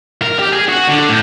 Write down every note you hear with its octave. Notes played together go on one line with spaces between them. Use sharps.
A#4
G4
G#4
F#4
D3
A2